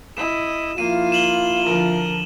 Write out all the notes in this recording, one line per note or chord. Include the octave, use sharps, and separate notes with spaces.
E4 D#5 E7
F3 A#3 E4 F4 F5 D#7
E7 F#7 G7
D3 F3 A#4